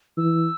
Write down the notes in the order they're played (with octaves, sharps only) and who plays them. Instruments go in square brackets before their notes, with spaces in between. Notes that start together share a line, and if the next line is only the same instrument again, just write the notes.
[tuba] E3 [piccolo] E6